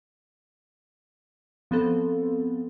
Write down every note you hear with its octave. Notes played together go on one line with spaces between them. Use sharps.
F3 B3 C4 A4